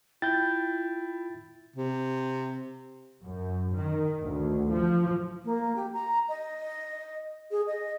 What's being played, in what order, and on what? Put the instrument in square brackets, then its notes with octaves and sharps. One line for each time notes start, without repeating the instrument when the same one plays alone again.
[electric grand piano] E4 [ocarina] F4 [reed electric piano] G5 G6 [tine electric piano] A6
[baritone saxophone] C3
[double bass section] F#2
D#3
D2
F3
[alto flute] A#3
G4
A#5
D#5
G#4
D#5